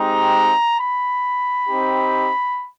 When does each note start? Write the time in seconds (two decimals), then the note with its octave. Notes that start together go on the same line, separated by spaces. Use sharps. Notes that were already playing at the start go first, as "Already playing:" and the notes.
Already playing: G#3 C4 D#4 G4 A#5
0.80 B5
1.68 C4 D#4 G4